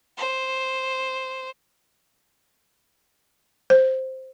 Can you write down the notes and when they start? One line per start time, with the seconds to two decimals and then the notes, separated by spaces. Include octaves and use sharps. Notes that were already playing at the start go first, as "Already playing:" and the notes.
0.17 C5
3.70 C5